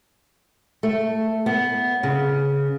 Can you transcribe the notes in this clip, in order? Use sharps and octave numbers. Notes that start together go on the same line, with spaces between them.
A3
B3
C#3